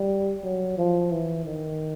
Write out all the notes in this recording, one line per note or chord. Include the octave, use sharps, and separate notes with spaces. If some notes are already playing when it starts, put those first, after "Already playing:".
Already playing: G3
F#3
F3
E3
D#3